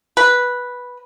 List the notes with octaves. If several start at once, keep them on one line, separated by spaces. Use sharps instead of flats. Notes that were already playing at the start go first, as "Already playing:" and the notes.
B4